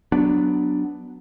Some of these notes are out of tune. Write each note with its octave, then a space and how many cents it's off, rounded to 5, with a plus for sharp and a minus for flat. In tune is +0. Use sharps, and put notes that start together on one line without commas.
F#3 +0 B3 +5 D4 +0